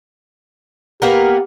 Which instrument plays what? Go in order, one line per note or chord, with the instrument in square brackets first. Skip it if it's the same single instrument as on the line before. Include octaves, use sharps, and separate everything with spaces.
[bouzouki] A#3 B3 A#4 [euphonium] G4